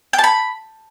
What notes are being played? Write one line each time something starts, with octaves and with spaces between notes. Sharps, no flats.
G5
A5
B5